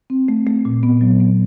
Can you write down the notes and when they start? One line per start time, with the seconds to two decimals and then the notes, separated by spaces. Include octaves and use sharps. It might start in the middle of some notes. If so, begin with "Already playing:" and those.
0.10 C4
0.28 A3
0.47 A3
0.65 A#2
0.83 B3
1.01 F#3
1.20 B3